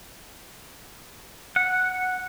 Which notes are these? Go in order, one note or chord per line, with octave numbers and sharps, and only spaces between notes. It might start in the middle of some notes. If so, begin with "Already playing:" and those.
F#5